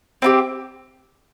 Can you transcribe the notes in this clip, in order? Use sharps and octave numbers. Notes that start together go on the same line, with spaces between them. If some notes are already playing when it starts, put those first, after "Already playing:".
C4 E4 G4